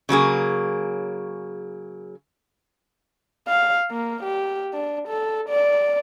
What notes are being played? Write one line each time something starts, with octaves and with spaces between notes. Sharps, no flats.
C#3 F#3 A#3 G#4
F5
A#3
G4
D4
A4
D5